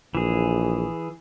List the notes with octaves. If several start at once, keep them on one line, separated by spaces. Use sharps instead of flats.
A#1 E3 G#4